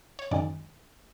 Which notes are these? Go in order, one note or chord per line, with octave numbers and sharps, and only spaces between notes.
C#5
F#2 D#3 G#3 D5